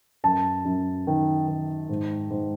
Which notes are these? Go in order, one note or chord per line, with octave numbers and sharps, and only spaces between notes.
F#2 A5
F#2
D#3
D#3
G#2
G#2